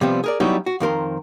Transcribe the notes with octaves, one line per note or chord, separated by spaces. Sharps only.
C3 F3 G3 B3 C4
G#4 A#4 D5
F#3 G3 B3 C#4 D#4 E4
F#4
F2 D#3 A#4 C5